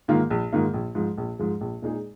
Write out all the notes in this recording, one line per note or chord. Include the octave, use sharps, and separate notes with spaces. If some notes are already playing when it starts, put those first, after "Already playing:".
G#2 D#3 A#3 F4
A#1
G#2 D#3 A#3 F4
A#1
G#2 F3 G#3
A#1
G#2 F3 G#3
A#1
A#2 G#3 D#4 G#4